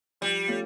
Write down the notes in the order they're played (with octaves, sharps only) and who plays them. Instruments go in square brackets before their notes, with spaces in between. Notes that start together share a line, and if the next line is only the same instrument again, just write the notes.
[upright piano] F3 [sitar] G3
[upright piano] A3 C#4 F4